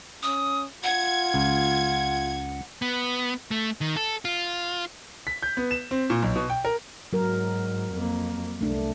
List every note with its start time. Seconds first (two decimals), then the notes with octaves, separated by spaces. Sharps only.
0.23 C#4 D#6
0.84 F4 F#5 G#6
1.34 C#2
2.82 B3
3.51 A3
3.81 D#3
3.97 A4
4.25 F4
5.27 B6
5.43 G6
5.57 B3
5.71 E7
5.91 C4
6.10 A#2
6.22 B1
6.35 B2
6.50 G5
6.65 A#4
7.13 G#2 F#3 A#4
7.93 F2 A#3
8.61 C2 A3 D4